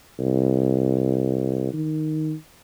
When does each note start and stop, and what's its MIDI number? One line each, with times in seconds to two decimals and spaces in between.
0.19 1.69 36
1.73 2.34 51